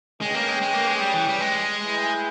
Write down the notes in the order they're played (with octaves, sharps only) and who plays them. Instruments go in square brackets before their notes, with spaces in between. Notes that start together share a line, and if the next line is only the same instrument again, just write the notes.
[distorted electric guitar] G#3 [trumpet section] C#4 G#4 B4 G5
[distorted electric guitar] A#3
G#3
G#3
A#3
G#3
G3
E3
G3
G#3
[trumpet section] E4 G#4 B4 E5 G5